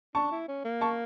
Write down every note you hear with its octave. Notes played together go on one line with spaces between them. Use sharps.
D4 A5 C#6
E4
C#4
A#3
A5 C#6